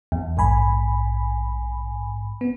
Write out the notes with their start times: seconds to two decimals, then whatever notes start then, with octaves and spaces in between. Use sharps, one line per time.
0.12 E2
0.37 A#1 G#2 G#5 B5
2.41 B3